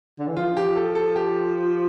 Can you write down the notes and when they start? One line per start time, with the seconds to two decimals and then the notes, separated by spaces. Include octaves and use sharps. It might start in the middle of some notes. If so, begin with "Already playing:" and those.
0.19 D3
0.28 E3
0.37 F3 F4
0.57 G4
0.76 A4
0.95 A4
1.16 G4